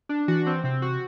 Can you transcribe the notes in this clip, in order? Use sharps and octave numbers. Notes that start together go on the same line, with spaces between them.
D4
E3 F#4
C4
C3 C4
F#4